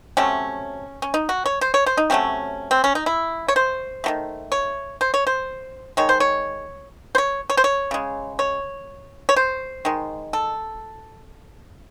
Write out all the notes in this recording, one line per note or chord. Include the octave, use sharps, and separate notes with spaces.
C3 F#3 A3 C#4
C#4
D#4
F#4
C#5
C5
C#5
C5
D#4
C3 F#3 A3 C#4
C4
C#4
D#4
E4
C#5
C5
D#3 F#3 A3
C#5
C5
C#5
C5
D#3 G#3 C#5
C5
C#5
C5
C#5
C#5
C5
C#5
C#3 G#3
C#5
C#5
C5
D#3 G#3
A4